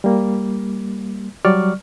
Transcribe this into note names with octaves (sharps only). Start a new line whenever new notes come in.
G3 A#3
F#3 G3 D5 C#6 F6